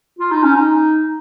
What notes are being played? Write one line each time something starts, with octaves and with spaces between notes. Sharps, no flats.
F4
D#4
C#4
D#4